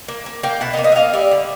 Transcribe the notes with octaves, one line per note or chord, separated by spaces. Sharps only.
A#3
A#3
A#3 F5 G5
B2 E5 F#5
D#5 F5
A#3
D#5 F5
E5
A#3 D#5 F5
G3 D5 E5
D3